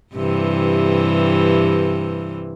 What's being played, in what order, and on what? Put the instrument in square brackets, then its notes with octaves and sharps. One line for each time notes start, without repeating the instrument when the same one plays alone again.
[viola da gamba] G2 C3 E3